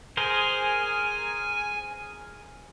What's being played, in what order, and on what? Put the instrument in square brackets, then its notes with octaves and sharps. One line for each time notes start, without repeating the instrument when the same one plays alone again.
[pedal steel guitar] G#4 A#4 C5 [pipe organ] G#5